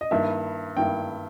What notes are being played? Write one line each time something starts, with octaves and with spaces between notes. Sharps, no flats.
D#5
G2 D#3 A#3 E4 E5
G2 D#3 A#3 E4 G5